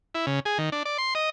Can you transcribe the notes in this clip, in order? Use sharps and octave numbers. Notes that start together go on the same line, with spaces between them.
E4
C#3
G#4
D#3
D4
D5
C6
D#5